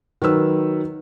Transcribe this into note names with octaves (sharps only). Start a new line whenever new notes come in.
D#3 F#3 B4 E6